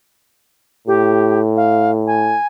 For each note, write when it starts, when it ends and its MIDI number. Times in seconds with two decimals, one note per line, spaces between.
0.87 2.36 45
0.87 1.42 67
1.56 1.91 77
2.07 2.47 80